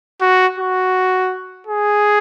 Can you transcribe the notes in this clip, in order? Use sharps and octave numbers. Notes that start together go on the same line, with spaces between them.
F#4
F#4
G#4